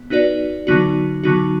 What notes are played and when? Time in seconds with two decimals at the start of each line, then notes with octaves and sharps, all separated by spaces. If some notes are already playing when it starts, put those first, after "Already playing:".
Already playing: B3
0.10 B3 D#4 F#4 B4 D5
0.67 D3 F#3 B3 D#4 F#4
1.24 D3 F#3 B3 D#4 F#4